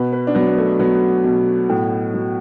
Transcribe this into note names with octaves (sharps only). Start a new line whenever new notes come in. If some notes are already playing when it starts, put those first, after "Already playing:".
Already playing: B2 B4
B4
D4
F#3 B3
B3
A3
F#3 B3
B2
A2
F#3